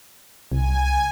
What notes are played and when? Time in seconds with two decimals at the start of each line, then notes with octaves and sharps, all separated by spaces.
0.52 C2 G#5